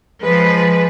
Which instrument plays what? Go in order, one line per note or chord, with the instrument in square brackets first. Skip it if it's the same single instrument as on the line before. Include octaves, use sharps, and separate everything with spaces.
[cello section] F3 B4 [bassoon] G#3